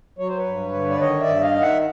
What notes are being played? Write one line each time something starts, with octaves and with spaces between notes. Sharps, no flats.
F#3 C#5
C5
B4 C#5
G2
D3
D5
D#3 C#5 D#5
D5 E5
G2
D#5 F5
D#3
E5 F#5